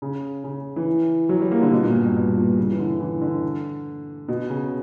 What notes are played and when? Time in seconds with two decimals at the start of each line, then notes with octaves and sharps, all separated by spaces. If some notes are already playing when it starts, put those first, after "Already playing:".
0.02 C#3
0.44 C#3
0.76 E3
1.29 F#3
1.41 G3
1.51 A#3
1.62 D3
1.72 B2
1.83 A#2
1.94 G2
2.04 G2
2.15 G2
2.36 A#2
2.57 C#3
2.70 E3
2.79 D3
3.01 E3
3.21 D3
4.28 B2
4.50 C#3